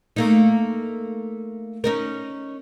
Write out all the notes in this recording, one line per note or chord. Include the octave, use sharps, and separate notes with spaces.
A3 A#3 D#4
C#4 D#4 A#4